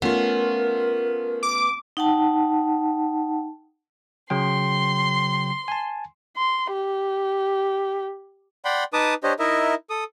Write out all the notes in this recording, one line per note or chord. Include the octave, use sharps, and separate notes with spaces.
A3 B3 C#4 F4 A#4
D6
D#4 F#5 G5 A5
C#3 F#3 G5 C6
G#5 A5
C6
G4
D5 F#5 G5 B5 C6
D#4 B4 A5 D6 D#6
D4 G4 C5 C#5 D#5
D#4 E4 A#4 D#5 E5
A4 D#6